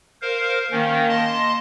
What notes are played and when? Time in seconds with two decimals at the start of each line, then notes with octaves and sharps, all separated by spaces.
0.22 A#4 C5 F5
0.72 D#3 A#3 C#4
1.09 D#5 A5 C6